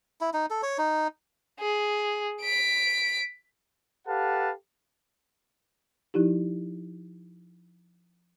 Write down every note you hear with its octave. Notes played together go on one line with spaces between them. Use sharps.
E4
D#4
A4
C#5
D#4
G#4
B6 D7
G4 A4 B4 F5 F#5 A5
F3 D#4 E4 G4